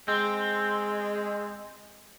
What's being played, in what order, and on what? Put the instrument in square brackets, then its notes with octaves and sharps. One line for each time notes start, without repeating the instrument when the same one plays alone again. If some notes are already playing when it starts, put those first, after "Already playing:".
[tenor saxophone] G#3 [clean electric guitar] C4